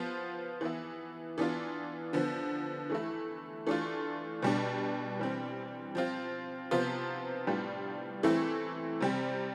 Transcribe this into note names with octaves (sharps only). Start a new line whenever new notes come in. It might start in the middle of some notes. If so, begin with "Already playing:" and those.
Already playing: F3 B3 F4
E3 B3 E4
E3 B3 D4 F4
D3 F3 B3
E3 A3 E4
E3 A3 D4 F4
B2 G3 D4
E3 G3 C4
F3 C4 F4
C3 F3 B3 F4
A2 G3 B3 D4 F4
E3 A3 C4 E4
C3 G3 C4